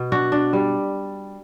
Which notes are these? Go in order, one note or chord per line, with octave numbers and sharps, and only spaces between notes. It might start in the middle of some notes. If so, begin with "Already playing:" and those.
Already playing: B2
D4 F#4
D4
G3